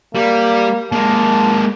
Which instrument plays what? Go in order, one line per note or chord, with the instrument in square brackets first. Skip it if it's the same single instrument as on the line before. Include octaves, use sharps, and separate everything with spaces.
[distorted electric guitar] G3 [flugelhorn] A#3
[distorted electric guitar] G#3 A#3 [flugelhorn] A5